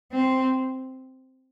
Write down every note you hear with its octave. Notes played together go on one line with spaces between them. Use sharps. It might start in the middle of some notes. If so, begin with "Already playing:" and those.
C4